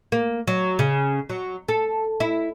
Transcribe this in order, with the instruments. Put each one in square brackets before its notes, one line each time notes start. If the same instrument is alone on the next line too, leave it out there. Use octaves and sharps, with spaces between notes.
[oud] A#3
F#3
C#3
F#3
A4
E4